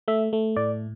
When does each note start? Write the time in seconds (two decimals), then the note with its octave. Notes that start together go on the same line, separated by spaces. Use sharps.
0.08 A3 E5
0.33 A3
0.56 A2 D5